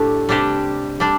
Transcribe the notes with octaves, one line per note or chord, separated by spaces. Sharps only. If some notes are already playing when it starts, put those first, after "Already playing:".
Already playing: A2 A3 D4 G4
C3 G3 D4 G4
G3 D4